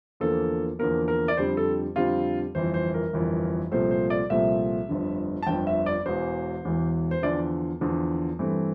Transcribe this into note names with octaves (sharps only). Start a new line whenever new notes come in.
E2 D3 F3 A#3 A4
E2 D3 F3 A#3 A#4
A#4
D5
F2 D3 G3 C4 C5
A4
F2 D3 G3 C4 F4
G1 F2 E3 C5
C5
A#4
G1 F2 E3
C2 A#2 F3 A3 C4 C5
C5
D5
C2 A#2 F3 A3 C4 E5
G1 F2 D3
A5
G1 F2 D3 G5
E5
D5
E1 E2 E3 C5
E1 E2 E3
C5
E2 D3 F3 D5
E2 D3 F3
G2 E3 A3 C4